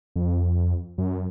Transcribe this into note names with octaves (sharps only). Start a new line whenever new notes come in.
F2
F#2